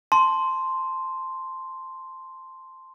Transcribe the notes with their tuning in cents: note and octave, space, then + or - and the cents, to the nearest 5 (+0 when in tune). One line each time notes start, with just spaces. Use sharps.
A5 +0 C6 +0